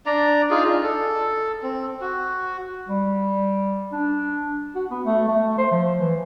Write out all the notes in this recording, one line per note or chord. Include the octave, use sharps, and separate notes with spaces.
D4 D5 A#5
D#4 F4 G#4
D4
A4
C4
F#4
G3
D4
F#4
B3
A3
A3
C5
F3
E3